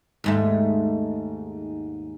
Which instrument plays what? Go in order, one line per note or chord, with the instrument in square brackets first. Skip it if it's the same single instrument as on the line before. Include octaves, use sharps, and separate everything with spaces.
[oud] D#2 G#2 A3